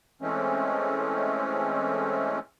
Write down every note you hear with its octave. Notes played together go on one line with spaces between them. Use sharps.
E3 G#3 A3 C4 C#4